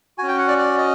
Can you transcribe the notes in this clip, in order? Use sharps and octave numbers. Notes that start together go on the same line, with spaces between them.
C#4 F#4 G#5
G5
F#5
D5
D5
D#5